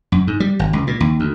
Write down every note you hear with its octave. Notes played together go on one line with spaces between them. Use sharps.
F#2
G#2
G3
G#1
C#2
A#2
D#2
D2